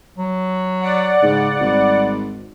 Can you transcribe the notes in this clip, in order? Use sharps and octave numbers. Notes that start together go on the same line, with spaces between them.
F#3
D5 F#5
G#2 C#3
G#1 G3